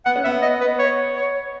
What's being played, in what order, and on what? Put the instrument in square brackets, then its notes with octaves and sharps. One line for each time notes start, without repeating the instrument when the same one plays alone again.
[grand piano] B3 [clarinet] F#5
[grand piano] C#4
[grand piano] B3 [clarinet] E5
[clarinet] D#5
B4
C#5
C#5